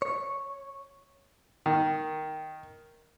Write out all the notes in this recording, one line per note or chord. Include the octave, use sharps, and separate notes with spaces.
C#5
D#3